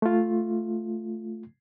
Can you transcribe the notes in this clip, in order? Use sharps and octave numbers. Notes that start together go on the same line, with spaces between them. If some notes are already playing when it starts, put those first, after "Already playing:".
A3 F4